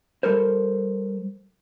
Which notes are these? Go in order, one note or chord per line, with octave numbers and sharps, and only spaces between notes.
G3 A4 A#4 C5